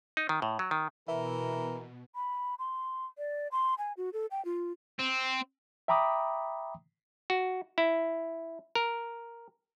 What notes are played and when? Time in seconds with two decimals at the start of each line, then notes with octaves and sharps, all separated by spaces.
0.17 D#4
0.29 D#3
0.42 A2
0.59 F#3
0.71 D#3
1.08 B2 E3 A#4 E5
2.15 B5
2.59 C6
3.18 D5
3.52 C6
3.78 G#5
3.97 F#4
4.13 A4
4.31 G5
4.45 F4
4.99 C4
5.88 E5 G5 A#5 B5 D6 D#6
7.30 F#4
7.78 E4
8.75 A#4